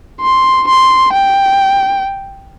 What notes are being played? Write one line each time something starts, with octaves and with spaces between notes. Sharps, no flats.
C6
C6
G5